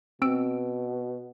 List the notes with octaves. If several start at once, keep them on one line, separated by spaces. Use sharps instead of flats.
B2 C4 E6 D7